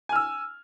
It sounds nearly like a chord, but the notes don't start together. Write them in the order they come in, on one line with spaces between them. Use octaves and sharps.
G#5 F6 E6